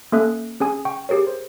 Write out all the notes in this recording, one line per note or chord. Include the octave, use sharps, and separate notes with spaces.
A#3 C#4 A4 E5 D#6 F#6
C#4 G#4 G#5 D#6
G5 C#6
G4 G#4 A#4 C#5
C5